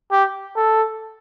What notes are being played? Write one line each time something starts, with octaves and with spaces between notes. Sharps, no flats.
G4
A4